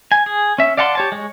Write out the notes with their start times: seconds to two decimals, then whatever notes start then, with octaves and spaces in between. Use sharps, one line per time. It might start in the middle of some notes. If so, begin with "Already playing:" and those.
0.12 G#5
0.26 G#4
0.58 C#4 E5
0.77 D5 F5 F#5 A5 C6
0.95 G4 C#5 A5
1.12 G#3 C#5